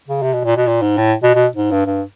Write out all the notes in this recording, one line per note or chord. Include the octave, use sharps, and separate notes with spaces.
C#3
C3
B2
A#2
B2
A#2
G#2
A2
B2
B2
G#2
G2
G2